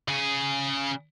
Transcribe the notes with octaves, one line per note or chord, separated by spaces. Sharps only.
C#3 G#4